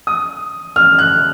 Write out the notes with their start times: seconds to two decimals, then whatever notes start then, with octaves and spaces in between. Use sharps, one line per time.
0.07 D#6
0.76 F6
0.99 F#6